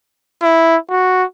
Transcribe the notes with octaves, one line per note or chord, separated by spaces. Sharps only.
E4
F#4